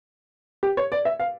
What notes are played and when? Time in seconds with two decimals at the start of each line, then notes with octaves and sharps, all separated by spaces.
0.63 G4
0.77 C#5
0.92 D5
1.05 E5
1.20 F5